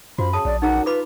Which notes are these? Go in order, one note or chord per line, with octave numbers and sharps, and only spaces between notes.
F#2 F3 F#4 B5
C#3 A5 D#6
A#1 D5
F#2 D#4 G#4 F#5 A#5
F4 B4 B5 D6